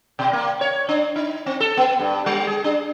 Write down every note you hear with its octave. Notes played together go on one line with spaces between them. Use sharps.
B2
A#3
C#5
D4
D#4
C4
A4
B3
G2
G3
G#4
D4